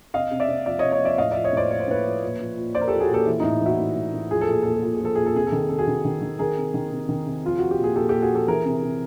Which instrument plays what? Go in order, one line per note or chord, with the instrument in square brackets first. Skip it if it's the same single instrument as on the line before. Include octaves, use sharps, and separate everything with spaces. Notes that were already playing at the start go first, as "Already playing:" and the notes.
[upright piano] C3 D#5 F5
C3
D5 E5
C3
F3 D5 E5
C#5 D#5
C3
C#5 D#5
F3 D5 E5
A2 D#5 F5
F3 D5 E5
C#5 D#5
A2 C5 D5
F3 C#5
C5
A2 B4 C#5
F3
A#2
F3
A#2
F3 C5 D5
A#4
F3 G4 A4
F#4 G#4
A#2 G4 A4
E3 E4
A2 D#4
E3 E4 F#4
A2
A2
A2
F3 G#4
A4
A#2 G#4
A#2 A4
G#4
A#2 A4
G#4
F3 A4
A#2 G#4
A4
C3 G#4
A4
D#3
G#4
C3 A4
F#4 G#4
D#3
D#3
D#3
D#3 G#4 A#4
C3
D#3
C3
D#3
C3
F3 F4
F3 F#4
G4
A#2
G#4
A#2 G4 A4
A#2 G4 A4
F#4 G#4
F3 G4 A4
E3 G#4 A#4
C3
C3